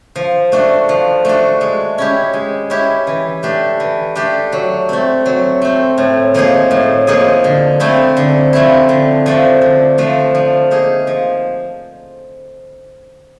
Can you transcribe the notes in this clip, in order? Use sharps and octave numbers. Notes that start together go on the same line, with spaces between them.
F3
A3 D4 F#4
F3
A3 D4 F#4
G#3
C#4 E4 G4
G#3
C#4 E4 G4
E3
A3 D4 G4
E3
A3 D4 G4
F#3
A3 C4
F#3
A3 C4
A2
F3 A#3 D#4 G#4
A2
F3 A#3 D#4 G#4
D3
F3 A3 C4 E4
D3
F3 A3 C4 E4
D3
F3 A3 D4
D3
F3 A3 D4
F3
A#3 D#4 G#4
F3